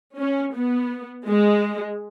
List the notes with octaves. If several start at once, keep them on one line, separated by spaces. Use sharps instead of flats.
C#4
B3
G#3